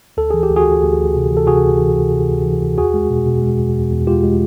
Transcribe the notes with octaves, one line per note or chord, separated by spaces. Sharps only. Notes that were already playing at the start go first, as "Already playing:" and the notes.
D2 A4
E3 G#4
G4
D2
F#4 G#4
D2
D2
D2
C3
E3
A4
C3 F#4 G#4
D2
E3
D2
C3
D2
E3
D2
E2 F#4 G#4
G#3
B2
B2
G#3
E2
E2
E2
G#3 F4 G4
G#3